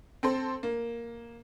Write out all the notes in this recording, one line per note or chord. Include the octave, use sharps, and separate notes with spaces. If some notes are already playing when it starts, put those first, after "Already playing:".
C4 A4 C5
A#3